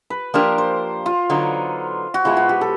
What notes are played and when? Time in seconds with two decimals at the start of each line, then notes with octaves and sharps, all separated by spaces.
0.10 B4
0.34 F3 A#3 D4 G4 A#4 C5
0.58 C5
1.06 F4
1.30 D3 F#3 B3 D#4
2.14 F#4
2.25 B2 G#3 B3 E4 F4
2.37 F#4
2.49 G4
2.61 A4